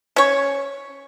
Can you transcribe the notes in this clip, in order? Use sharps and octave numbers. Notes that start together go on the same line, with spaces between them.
C#4 C#5